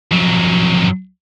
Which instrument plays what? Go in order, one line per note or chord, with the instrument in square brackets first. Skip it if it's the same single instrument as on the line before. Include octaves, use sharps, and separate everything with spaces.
[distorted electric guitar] F2 F#3